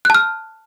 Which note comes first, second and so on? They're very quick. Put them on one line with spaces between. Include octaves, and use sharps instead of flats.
F#6 A5 F6